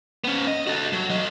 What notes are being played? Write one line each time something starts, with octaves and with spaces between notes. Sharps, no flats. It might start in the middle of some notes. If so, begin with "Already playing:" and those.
B3 C#4
D#5
F#4 A4
F#3
F#3 D#5